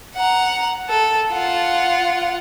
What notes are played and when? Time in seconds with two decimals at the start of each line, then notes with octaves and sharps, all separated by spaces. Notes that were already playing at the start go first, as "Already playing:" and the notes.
0.16 F#5 A#5
0.89 A4
1.31 F4 F#5